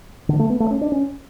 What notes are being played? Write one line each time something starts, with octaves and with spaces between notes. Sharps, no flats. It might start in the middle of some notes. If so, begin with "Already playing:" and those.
D3
A3
B3
A3
C#4
D4
C#4